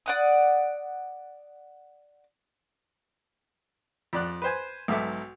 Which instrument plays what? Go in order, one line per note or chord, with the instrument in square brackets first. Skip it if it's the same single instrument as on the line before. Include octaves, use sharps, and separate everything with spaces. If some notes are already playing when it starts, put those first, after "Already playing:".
[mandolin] D5 F#5 D#6
[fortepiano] F2 D5 F#6
B4 C5 G#5
B1 G#2 A4 E5 D6